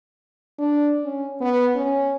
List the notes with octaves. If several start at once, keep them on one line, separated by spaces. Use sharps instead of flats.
D4
C#4
B3
C#4